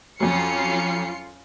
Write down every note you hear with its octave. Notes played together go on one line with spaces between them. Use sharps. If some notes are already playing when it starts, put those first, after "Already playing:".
F2 F#3 C#4 F4 C7 C#7